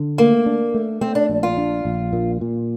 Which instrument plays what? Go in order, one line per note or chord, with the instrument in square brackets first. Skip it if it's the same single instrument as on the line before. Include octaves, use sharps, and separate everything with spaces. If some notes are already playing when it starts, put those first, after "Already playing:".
Already playing: [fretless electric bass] D3
[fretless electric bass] A3 [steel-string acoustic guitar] A#3
[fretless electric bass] D4
A3
[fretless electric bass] A3 [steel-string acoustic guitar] C4
[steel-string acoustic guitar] D4
[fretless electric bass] A#1
[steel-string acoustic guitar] F4
[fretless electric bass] D4
A#1
A#2
A#2